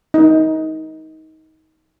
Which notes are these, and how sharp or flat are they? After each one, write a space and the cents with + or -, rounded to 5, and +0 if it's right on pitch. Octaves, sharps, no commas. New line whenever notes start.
D#4 +20